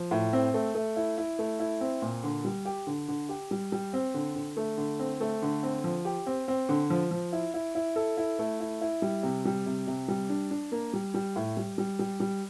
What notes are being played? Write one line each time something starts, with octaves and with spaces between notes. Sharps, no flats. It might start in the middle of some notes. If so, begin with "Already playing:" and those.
Already playing: F3
A2
C4
A3
A3
E4
E4
A3
E4
C4
A#2
D3
G3
G4
D3
D3
G4
G3
G3
C4
D3
D3
A3
D3
C4
A3
D3
C4
F3
G4
C4
C4
D3
F3
F3
E4
E4
E4
A4
E4
A3
E4
E4
G3
C3
G3
C3
C3
G3
D4
D4
A#3
G3
G3
A2
G3
G3
G3
G3